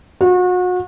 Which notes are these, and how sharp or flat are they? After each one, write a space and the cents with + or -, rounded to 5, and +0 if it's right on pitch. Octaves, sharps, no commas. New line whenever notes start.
F#4 -35